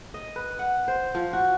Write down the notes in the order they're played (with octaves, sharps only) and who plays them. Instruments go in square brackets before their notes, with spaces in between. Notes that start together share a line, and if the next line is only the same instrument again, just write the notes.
[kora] D#5
B4
F#5
C5
F3
F#4